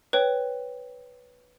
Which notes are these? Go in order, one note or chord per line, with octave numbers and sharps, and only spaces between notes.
B4 C#5 G5